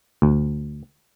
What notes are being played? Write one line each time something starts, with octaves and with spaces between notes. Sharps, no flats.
D2